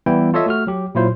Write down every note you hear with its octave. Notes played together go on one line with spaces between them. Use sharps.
E3 G3 B3 E4 G5
F4 A4 C#5 D#5 E5
A3 F#4 F6
F#3 G4
A#2 F#3 E4 F4 C5